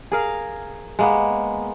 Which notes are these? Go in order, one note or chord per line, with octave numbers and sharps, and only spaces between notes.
G#4 A#4 F5
G#3 A#3 B3